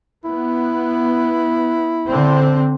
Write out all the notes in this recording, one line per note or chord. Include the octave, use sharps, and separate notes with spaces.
B3 E4
D3 C4